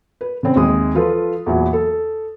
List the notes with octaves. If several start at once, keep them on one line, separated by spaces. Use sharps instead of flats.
B4
C#3 C4
D#2 C3 G#3 D#6
F3 F4 A4 B4
E2 A#2 E3 F#3
A4